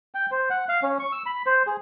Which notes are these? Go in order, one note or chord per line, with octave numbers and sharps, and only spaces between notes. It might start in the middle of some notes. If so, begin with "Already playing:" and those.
G5
C5
F#5
F5
C#4
C#6
E6
B5
C5
G#4